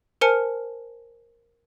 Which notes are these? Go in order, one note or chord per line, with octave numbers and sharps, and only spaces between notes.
A#4 C5 G#5 A5 F6 C#7